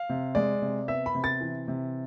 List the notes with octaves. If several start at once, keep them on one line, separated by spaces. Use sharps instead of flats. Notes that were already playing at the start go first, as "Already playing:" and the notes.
Already playing: F5
C3
G#3 D5
C3
B3 E5
B5
C3
A6
E3
C3